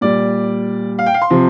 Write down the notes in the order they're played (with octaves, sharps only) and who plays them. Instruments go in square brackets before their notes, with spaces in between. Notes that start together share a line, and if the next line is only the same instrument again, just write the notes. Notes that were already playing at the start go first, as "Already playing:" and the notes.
[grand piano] A#2 G3 D5
F5
G5
F5
C6
C3 F3